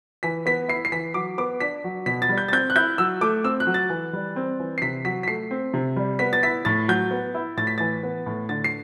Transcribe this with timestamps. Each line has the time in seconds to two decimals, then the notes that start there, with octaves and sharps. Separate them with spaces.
0.23 E3 B6
0.46 B3 B6
0.68 E4 C7
0.85 C7
0.92 E3 B6
1.14 F#3 D6
1.38 B3 D6
1.60 D4 B6
1.84 F#3
2.06 B2 B6
2.22 A6
2.29 G3
2.38 G6
2.49 A6
2.52 C4 G6
2.70 F#6
2.76 E4 G6
2.98 F#3 E6
3.21 A3 D6
3.44 C4 E6
3.60 F#6
3.67 F#3
3.74 A6
3.90 E3
4.13 G3
4.36 C4
4.60 E3
4.78 C7
4.82 C3 B6
5.05 F#3 B6
5.23 B6
5.27 A3 C7
5.51 C4
5.74 C3
5.96 G3
6.19 B3 B6
6.33 A6
6.43 E4 B6
6.65 A2 A6
6.88 F#3 G6
7.11 B3
7.35 E4
7.57 A2 A6
7.67 B6
7.78 E3 A6
8.03 B3
8.26 A2
8.49 D3 A6
8.64 C7